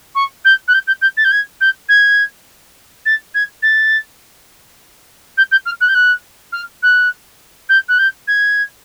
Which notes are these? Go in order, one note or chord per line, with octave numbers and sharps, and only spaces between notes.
C#6
G6
F#6
G6
G6
G6
A6
G6
G#6
G6
G#6
A6
G#6
A6
G6
G6
F6
F#6
G6
F#6
F6
F#6
G6
F#6
G6
G#6